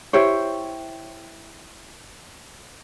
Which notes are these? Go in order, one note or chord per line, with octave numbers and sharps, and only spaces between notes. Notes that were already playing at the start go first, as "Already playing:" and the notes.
E4 G4 C5 C#5